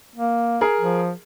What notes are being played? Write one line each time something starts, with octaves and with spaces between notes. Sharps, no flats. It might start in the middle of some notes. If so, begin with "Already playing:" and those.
A#3
G#4 A#4
F3